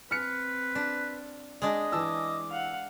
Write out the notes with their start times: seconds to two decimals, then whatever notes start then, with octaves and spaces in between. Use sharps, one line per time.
0.11 C4 B4 F6 C#7
0.75 D4
1.62 G#3 D4 D#5
1.92 E3 A5 D6 E6
2.50 F5 F#5